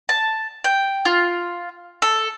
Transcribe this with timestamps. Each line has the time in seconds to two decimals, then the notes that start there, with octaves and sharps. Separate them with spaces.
0.09 A5
0.64 G5
1.05 F4
2.02 A4